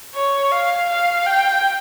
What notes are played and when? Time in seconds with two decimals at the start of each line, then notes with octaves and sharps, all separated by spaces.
0.15 C#5
0.51 F5
0.89 F5
1.26 G5